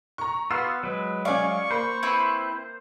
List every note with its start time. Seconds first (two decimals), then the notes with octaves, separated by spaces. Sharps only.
0.18 A#5 C#6
0.51 B3 F4 F#4 E6 C7
0.83 F#3 G#3 B4
1.25 C#4 D5 F5 G#5 C#6
1.71 A#3 C5 B5
2.03 C4 E4 B4